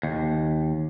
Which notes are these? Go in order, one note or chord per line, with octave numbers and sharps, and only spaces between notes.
D#2